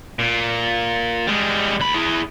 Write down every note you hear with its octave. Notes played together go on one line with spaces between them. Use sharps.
A#2
G3 G#3
D2 B5
E4 G#4